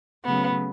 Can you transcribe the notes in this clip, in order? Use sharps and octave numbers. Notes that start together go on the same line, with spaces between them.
C#3 F#3 A3 B3